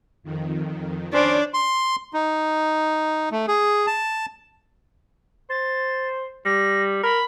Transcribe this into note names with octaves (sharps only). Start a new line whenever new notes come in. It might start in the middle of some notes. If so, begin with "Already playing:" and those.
F2 D#3
C#4 D4 C5 D5
C6
D#4
A3
G#4
A5
C5 A6
G3 A#6
A#4 B5